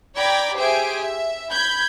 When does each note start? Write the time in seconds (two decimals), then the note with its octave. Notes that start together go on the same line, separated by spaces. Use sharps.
0.17 D5 G5 A#5 B5 D6 G#6
0.57 G4 G#4 C5 E5 G#5 D7
0.98 E5
1.52 B5 G6 G#6